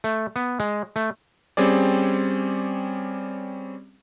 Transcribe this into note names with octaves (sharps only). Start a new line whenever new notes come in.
A3
B3
G#3
A3
G3 C4 C#4 G#4 D5